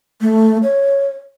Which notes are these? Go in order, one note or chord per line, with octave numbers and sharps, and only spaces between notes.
A3
C#5